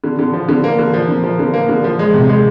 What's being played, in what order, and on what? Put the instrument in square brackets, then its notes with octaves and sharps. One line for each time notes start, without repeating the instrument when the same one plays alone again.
[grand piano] D3
D3
F3
D3
A#3
D3
F3
D3
F3
D3
A#3
D3
F3
G#3
C3
G#3